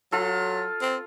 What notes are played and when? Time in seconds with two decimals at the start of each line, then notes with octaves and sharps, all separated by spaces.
0.12 F#3 F4 A4
0.81 C4